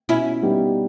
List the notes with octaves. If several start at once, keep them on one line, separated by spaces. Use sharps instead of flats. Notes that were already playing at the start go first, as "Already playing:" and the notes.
B2 C#4 E4
G3 B3 D#4 G4